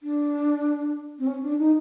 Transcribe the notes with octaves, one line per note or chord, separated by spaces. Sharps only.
D4
C4
C#4
D4
D#4